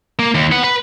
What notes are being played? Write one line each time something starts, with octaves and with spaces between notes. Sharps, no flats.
A#3
D#2
B3 F#5
B4